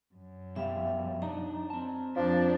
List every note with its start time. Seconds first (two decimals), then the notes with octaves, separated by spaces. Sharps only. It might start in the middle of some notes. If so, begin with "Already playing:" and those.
0.15 F#2
0.56 B2 G3 G4 E5 F5
1.22 D4 D#4 A#5
1.70 C4 A5
2.16 F2 F3 D4